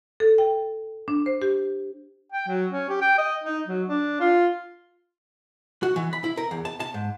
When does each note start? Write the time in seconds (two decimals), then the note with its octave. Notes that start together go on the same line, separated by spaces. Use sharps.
0.20 A4
0.38 G5
1.08 D4
1.26 C5
1.42 G4
2.32 G5
2.48 F#3
2.70 C#4
2.89 G4
3.01 G5
3.18 D#5
3.44 D#4
3.67 F#3
3.88 D4
4.20 F4
5.83 F#4
5.96 E3
6.13 B5
6.24 E4
6.37 A#4
6.51 E2
6.65 A5
6.80 A5
6.94 G#2